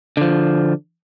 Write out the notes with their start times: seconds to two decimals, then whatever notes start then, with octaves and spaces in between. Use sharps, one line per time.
0.17 D3 F3